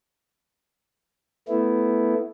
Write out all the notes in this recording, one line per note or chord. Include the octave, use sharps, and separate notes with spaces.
A3 B3 E4